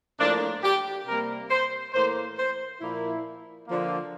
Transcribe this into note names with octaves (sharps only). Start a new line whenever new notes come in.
A2 F3 A#3 D4
G4
C3 G3 A#3 A#4
C5
A2 E3 A#3 C5
C5
A#2 F3 A#3 E4
D3 F3 A#3